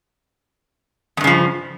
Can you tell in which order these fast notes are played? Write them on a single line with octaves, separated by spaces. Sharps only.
E2 G2 C#3 F3